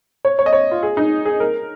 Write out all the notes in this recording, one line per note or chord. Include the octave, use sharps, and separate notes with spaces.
C#5
C#5
D#5
C#5
F4
G#4
D#4
G#4
A#4